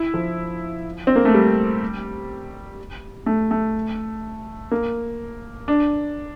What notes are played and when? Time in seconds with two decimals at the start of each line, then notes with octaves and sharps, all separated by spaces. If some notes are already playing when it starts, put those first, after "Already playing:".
Already playing: E4
0.14 F3
1.07 C4
1.16 A#3
1.25 A3
1.34 G3
3.26 A3
3.51 A3
4.71 A#3
5.68 D4